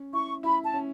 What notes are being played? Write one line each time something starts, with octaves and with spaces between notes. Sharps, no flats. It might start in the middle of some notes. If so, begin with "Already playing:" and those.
Already playing: C#4
E4 C#6
E4 B5
A5
C#4